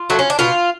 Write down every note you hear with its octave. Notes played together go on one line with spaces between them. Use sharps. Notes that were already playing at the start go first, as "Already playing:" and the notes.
Already playing: F4
F#3 A3
C#4
D4
B2 F4